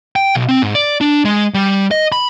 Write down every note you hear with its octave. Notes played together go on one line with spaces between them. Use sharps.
G5
B1
C4
G#2
D5
D4
G#3
G3
D#5
B5